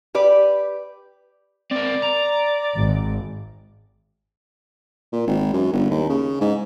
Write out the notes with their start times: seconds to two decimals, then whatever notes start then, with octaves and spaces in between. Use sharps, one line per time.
0.15 G4 B4 D5
1.71 C4 A#4 D5
2.03 A#5
2.77 G#1
5.12 A#2
5.27 G#1
5.53 F#2
5.73 G1
5.91 D#2
6.10 C#3
6.41 G#2